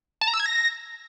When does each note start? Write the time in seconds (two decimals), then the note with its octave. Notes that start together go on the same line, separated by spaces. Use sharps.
0.21 A5
0.28 A#5
0.34 E6
0.40 G#6
0.46 A#6